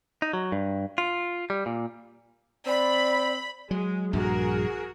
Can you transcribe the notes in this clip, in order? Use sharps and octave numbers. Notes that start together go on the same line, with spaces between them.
D#4
F#3
G2
F4
G3
A#2
C4 D5 B5
F#3 G#3
A#1 G2 F#4 G#4 A#4